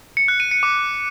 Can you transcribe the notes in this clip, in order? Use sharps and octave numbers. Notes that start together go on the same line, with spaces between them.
C#7
F#6
D#7
C#7
D6